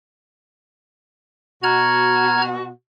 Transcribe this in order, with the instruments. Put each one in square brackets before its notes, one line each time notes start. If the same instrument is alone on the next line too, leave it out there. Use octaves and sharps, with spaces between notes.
[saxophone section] B2 F#4 [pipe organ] A#5 F6 G#6